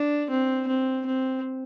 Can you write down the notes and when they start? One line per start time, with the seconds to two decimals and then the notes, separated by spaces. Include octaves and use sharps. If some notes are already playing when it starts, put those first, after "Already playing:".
Already playing: D4
0.30 C4
0.67 C4
1.06 C4